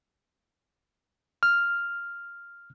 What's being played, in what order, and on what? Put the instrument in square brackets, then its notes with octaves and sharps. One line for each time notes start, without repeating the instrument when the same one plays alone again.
[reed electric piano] F6